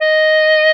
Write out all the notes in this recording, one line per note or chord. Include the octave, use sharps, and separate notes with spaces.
D#5